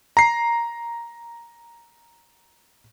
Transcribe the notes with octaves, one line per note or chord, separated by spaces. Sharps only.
A#5 C7